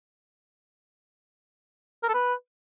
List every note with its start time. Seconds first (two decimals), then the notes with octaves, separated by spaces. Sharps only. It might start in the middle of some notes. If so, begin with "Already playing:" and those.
2.03 A#4
2.08 A4
2.14 B4